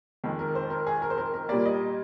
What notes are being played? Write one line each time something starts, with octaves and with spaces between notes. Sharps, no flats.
F2 D#3 G#3
A#4
C5
A#4
G#4
A#4
C5
A#4
A#4
A#2 G3 A#3 D5
D#5